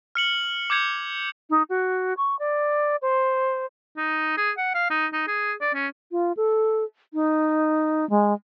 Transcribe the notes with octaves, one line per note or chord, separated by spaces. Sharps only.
F6 C#7 F#7
D6 G6 G#6 C#7 F7
D#4
F#4
C#6
D5
C5
D#4
G#4
F#5
F5
D#4
D#4
G#4
D5
C#4
F4
A4
D#4
G#3